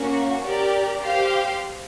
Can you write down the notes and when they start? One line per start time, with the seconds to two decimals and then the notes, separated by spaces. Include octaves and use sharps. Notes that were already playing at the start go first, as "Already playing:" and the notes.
Already playing: A#3 C#4 F#4
0.43 G4 A#4 D5
1.00 G4 C5 F5